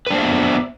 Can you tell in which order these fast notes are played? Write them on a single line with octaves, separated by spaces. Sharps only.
B4 D4 C5 E5 B3